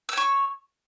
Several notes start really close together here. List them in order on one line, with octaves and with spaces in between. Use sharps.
E6 C#5 C#6